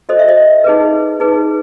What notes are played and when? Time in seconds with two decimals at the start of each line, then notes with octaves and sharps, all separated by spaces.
0.09 F#4 A4 C5 D#5
0.19 E5
0.29 D#5
0.64 D#4 G#4 B4
1.20 D#4 G#4 B4